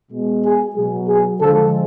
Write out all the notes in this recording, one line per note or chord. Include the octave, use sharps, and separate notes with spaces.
B2 G#3
G#4
B2 F#3 G#4
G#4
D3 F3 G#3 A4